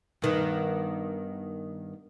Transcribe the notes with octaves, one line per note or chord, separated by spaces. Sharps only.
G2 D#3 B3